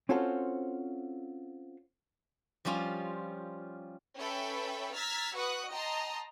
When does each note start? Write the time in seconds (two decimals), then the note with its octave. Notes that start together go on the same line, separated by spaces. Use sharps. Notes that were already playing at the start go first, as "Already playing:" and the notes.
0.09 C4 C#4 F4 F#4 A4 C5
2.65 F3 G3 C#4 F4
4.18 C#4 A4 B4 E5 G5 B5
4.94 A#5 E6 F6 G#6 A6 B6
5.35 F#4 B4 F#5 C#6 D#6 F#6
5.69 D#5 G5 A5 A#5 C6 D#6